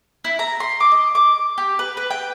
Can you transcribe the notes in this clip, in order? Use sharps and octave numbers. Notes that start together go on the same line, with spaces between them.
E4
A#5
C6
D6
D#5
D6
G4
B4
B4
G5